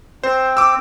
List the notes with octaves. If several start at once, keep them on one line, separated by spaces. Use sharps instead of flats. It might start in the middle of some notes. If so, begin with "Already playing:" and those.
C4 C5
D6 E6